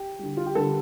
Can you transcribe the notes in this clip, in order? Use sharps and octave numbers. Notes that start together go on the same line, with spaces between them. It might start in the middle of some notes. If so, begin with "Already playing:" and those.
Already playing: G4
D3 G3
F4
G4
D3 G3 A4